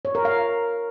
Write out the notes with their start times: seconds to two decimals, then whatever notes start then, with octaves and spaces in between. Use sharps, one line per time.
0.05 C#5
0.15 A#4
0.25 F5